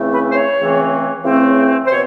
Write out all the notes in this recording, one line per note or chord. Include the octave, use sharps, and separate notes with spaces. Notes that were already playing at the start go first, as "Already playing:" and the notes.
Already playing: C#2 C#3 E3 A3 C4
B4
C5
C#5
C#2 C#3 E3 A3 C4
C#2 C#3 E3 A3 C4
C5
B2 C#5